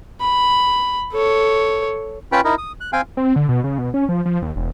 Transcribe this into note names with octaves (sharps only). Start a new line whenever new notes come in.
B5
A4 C#5
C#4 F4 B4 G5 B5
D#4 E4 A#4
D#6
F#6
C4 F5 G5 G#5
C4
D3
B2
C#3
B2
C#4
F3
F3
D#2
E1